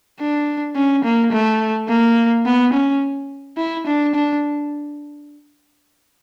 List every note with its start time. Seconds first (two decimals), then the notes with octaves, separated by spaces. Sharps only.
0.20 D4
0.76 C#4
1.04 A#3
1.32 A3
1.89 A#3
2.46 B3
2.73 C#4
3.58 E4
3.86 D4
4.15 D4